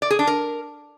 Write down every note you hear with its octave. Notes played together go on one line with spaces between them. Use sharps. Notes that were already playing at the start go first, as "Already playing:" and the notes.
D5
G#4
D4
A#4